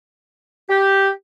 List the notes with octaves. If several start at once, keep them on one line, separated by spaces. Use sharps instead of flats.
G4